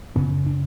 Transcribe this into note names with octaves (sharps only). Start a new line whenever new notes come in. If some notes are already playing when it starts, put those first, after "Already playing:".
F#2 C#3 B3
D4